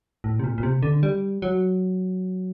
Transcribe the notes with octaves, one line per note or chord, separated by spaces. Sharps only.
A2
C3
A#2
A#2
C3
D3
G3
F#3